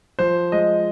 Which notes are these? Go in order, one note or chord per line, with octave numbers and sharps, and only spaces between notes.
F3 C5
G#3 D#5